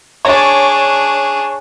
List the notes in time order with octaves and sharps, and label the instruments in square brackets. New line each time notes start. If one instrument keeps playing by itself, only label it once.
[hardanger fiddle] D4 G#4 [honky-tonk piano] C#5